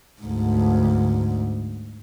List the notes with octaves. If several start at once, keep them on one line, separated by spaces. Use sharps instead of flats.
D2 G#2